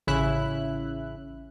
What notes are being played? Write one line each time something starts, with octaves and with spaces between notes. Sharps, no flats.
A1 C#3 C#4 E4 E5 F#6